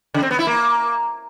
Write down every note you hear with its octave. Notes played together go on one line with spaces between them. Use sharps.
C#3
C4
B3
E4
A#3